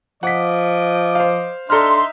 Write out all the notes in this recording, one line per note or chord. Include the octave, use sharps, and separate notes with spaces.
F3 D#5 F#5 D6 B6
C5 F5
D4 D#4 A4 E5 A#5 C6 F6